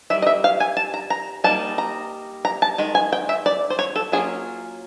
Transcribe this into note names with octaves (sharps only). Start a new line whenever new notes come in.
D#3 G3 E5
D#5
E5
F5
G#5
A5
A#5
A#5
G3 A#3 D#4 A5
A#5
A#5
A5
D#3 G#3
G#5
G5
E5
D5
C5
C#5
A4
F#3 A#3 C#4 F4 G#4